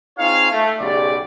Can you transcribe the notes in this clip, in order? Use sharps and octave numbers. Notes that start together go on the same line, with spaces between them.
C4 D#4 F4 G#4 C#5 F5
A3
B1 C#3 G4 D5